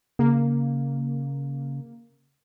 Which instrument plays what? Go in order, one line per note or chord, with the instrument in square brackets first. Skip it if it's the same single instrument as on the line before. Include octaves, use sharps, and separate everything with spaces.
[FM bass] C#3 [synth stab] A#3